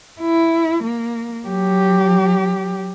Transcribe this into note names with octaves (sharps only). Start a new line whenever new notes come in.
E4
A#3
F#3 G4